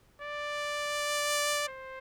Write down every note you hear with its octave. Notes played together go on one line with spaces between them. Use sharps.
D5
C5